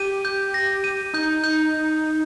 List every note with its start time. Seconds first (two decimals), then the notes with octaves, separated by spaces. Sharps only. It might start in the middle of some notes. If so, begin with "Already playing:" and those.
Already playing: G4 D#7
0.25 G6
0.54 A#6
0.84 D#7
1.14 D#4 G6
1.44 G6